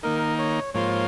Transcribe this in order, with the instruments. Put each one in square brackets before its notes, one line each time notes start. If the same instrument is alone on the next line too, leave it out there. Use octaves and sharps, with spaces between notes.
[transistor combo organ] D#3 A#3 D#4 [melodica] A#4
[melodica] C#5
[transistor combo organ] G#2 F3 A#3 F4 C5 [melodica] C#5